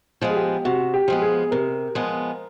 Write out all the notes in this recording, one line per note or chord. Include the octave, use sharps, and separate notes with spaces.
F3 G#3 B3
G#4
G4
C3 F#4
G4
F3 G#3 B3
G#4
C3 A#4
F3 G#3 B3